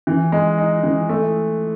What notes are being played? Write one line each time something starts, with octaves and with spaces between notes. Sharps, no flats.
E3
G#3
D#4
E3
A3